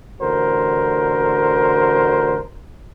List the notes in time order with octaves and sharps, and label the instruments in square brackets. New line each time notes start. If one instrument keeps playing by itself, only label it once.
[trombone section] A1 D3 F#4 A#4 C5